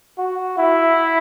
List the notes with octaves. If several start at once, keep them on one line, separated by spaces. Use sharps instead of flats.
F#4
E4